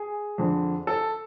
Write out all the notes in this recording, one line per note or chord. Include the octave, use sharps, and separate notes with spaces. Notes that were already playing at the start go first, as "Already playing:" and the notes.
Already playing: G#4
F2 D3
A4